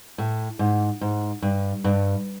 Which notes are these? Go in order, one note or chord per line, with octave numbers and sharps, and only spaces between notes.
A2
G#2
G#2
G2
G2